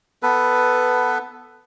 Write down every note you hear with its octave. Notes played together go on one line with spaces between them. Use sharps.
B3 A4 B4